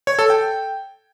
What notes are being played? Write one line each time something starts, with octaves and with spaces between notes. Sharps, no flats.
C#5
A4
G5